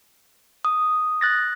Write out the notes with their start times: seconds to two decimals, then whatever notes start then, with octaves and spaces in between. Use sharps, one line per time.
0.65 D#6
1.21 F#6 A6 A#6